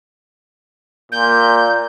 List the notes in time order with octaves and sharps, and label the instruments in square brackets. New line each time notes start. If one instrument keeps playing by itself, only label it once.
[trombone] A#2 [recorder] G6